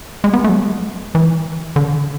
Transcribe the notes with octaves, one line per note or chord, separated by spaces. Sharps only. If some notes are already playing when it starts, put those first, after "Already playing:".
G#3
B3
A3
F#3
G#3
E3
D3